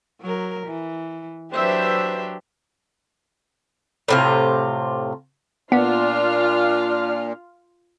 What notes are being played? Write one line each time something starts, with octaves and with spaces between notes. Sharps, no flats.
F#3 A#4
E3
F#3 D4 G4 B4 C5 E5
A2 C3 F4
A#2 B3 D4 F4 F6